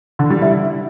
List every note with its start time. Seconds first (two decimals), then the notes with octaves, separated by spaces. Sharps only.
0.19 D3
0.30 G3
0.42 E4